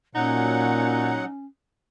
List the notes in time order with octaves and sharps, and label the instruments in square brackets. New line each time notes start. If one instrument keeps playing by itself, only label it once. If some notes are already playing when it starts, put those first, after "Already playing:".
[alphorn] A#2 [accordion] F#3 F#5 [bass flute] C#4 [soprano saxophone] D#4